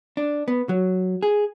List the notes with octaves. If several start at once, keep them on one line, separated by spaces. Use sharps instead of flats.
D4
B3
F#3
G#4